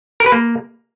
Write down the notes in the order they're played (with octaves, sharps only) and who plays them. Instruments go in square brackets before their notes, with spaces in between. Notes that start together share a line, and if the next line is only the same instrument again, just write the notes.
[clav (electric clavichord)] A#4
B4
A#3